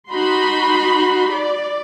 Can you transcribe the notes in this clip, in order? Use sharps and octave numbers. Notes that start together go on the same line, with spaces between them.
D#4 F#4 B5 C6
D5